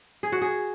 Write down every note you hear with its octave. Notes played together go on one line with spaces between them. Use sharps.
G#4
F#4
G#4